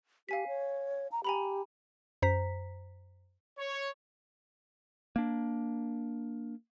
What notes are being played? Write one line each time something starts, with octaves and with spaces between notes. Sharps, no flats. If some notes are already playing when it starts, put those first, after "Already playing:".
G4 F5 G#5 B6
C#5
A#5
G4 G#5 A#5 B5
F#2 C5 A#5 B6
C#5
A#3 D4